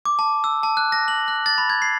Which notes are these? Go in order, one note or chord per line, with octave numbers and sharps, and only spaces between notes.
D6
A5
E6
A5
F#6
A#6
F#7
F#6
A6
B5
G#6
C7